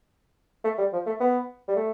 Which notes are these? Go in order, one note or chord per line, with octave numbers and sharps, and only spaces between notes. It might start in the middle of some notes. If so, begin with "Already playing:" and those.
A3
G3
F3
A3
B3
G3
A3